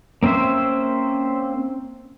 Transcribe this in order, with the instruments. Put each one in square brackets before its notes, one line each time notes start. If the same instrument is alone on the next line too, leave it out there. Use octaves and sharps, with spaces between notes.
[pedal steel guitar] A#3 C4 C#4 C5 E5